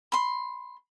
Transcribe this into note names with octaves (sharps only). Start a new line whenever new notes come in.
B5 C6